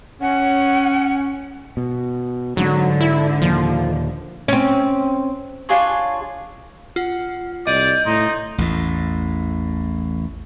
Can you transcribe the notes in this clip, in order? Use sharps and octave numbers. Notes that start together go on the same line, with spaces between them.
C#4 F#5
B2
G#2 D3 F#3
E4
D#2 A#2 F3
C4 C#4
D4 F4 G#4 C#5
F4 F#5
C2 D5 D#5 G6
A2 D#4 C6
A1 E2 A2